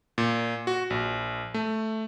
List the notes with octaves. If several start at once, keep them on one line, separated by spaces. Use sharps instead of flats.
A#2
F#4
A#1
A3